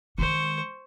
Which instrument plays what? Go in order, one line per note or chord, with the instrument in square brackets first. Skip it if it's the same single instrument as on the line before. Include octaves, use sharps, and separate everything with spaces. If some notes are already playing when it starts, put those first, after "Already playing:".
[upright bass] D#3 G#3 [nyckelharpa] C5 C#6